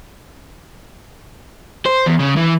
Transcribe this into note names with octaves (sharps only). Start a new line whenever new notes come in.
C5
E2
C#3
E3